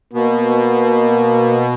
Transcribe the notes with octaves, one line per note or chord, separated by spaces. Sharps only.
B2 A#3